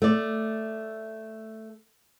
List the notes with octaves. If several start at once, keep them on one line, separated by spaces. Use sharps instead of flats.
A3 D5